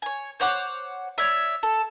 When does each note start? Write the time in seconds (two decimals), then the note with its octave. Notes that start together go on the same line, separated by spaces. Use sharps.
0.02 C#5 G#5
0.40 C5 C#5 F#5 D6
1.18 C#5 D5 E5
1.63 A4